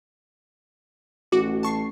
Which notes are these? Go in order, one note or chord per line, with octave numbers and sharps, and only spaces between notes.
A1 F#4 D6
A5 C#6 C7